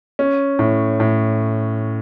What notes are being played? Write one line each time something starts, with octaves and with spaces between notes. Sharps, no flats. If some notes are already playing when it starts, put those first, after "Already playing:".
C#4
A2
A2